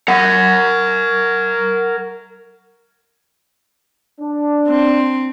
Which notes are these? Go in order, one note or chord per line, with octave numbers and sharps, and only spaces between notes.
A#4 F#5
D4
C4